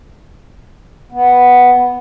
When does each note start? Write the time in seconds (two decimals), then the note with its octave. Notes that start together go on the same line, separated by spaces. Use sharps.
1.12 B3